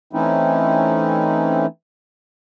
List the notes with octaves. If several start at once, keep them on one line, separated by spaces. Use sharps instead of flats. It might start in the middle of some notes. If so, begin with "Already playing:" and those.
E3 A3 C4 C#4 D#4 E4